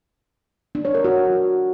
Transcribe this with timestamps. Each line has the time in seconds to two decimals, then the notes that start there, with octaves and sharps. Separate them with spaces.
0.75 D4
0.85 C#5
0.95 A#4
1.04 F#4